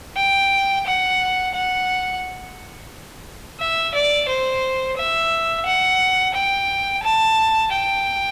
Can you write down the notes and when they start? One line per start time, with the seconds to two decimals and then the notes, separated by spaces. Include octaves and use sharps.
0.17 G5
0.86 F#5
1.54 F#5
3.60 E5
3.94 D5
4.29 C5
4.97 E5
5.66 F#5
6.34 G5
7.03 A5
7.72 G5